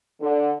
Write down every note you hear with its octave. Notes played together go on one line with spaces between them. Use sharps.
D3